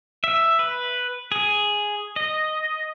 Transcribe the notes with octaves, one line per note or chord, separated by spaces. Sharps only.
E5
B4
G#4
D#5